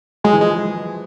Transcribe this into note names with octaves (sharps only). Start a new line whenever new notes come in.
F#3 G#3
E3
F3 G#3